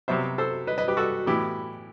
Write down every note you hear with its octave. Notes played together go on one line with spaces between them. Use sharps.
C3 F#3 B3 C5 E5
A4 C5
B4 D#5
B4 D#5
G4 B4
F#4 A4
A2 E3 B3 E4 G4